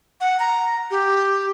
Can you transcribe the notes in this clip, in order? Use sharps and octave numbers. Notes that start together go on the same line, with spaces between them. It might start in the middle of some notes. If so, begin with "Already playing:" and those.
F#5
A#5
G4